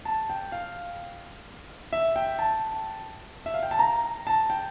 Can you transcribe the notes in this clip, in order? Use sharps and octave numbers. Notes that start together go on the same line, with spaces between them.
A5
G5
F5
E5
G5
A5
E5
F5
G5
A5
A#5
A5
G5